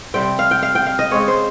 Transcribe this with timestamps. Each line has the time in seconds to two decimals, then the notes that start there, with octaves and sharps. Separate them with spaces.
0.14 C3 G3 C4 G5
0.39 F5
0.51 G5
0.62 F5
0.75 G5
0.86 F5
0.99 D#5
1.11 C#3 G#3 C4 C#5
1.28 C5